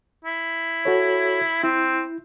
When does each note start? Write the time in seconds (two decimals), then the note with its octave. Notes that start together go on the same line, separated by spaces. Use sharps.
0.24 E4
0.85 F#4 A4 C#5
1.64 C4 E4